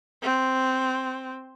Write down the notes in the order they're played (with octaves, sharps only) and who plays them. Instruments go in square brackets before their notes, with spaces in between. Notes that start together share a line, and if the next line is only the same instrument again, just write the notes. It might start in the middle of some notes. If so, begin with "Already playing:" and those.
[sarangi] C4